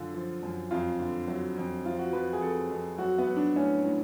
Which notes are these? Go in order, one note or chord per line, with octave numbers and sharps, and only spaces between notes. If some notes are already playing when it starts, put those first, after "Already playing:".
Already playing: F#2 D3 F4
F3
F#2
F2 F4
D3
F#3
F2
F3 F4
F#4
F3 B4
G#4
F2 A4
F2
F#3 F#4
B3
F#3
D4
A2 C#4
A2